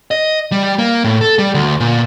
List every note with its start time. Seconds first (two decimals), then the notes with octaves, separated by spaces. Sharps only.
0.11 D#5
0.52 G3
0.78 A#3
1.04 A2
1.21 A4
1.39 G3
1.54 D2
1.80 A#2